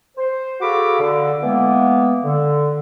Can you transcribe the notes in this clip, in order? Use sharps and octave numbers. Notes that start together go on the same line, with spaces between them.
C5
F#4 G#4 A4 F5 B5 D6
D3
E3 G#3 A#3 B3
D3